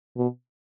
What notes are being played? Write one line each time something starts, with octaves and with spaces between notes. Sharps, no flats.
B2